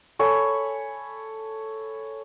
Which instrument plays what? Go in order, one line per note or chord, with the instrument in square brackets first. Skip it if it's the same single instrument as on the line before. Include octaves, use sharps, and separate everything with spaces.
[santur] A4 C#5 G#5 B5